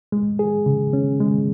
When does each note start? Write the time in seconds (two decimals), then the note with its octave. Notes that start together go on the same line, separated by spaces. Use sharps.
0.12 G#3
0.39 G#4
0.66 C#3
0.93 C#4
1.20 G#3